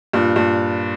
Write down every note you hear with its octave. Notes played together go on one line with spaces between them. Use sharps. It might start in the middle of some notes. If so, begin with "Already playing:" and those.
G2 A#2
G2 A#2